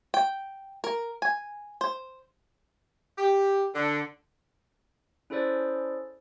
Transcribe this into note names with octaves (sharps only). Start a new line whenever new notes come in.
G5
A#4
G#5
C5
G4
D3
C#4 E4 G#4 A4 C5 D5